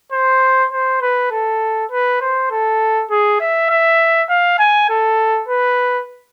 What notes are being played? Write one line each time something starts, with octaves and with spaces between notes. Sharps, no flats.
C5
C5
B4
A4
B4
C5
A4
G#4
E5
E5
F5
G#5
A4
B4